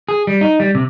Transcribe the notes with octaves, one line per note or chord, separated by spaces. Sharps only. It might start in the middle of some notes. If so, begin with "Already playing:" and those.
G#4
G3
D#4
G3
C3